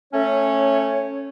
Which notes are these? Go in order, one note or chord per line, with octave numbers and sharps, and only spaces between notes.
A3 C#4 C#5